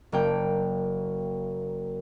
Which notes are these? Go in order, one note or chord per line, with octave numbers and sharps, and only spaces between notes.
F#1 A#3 G5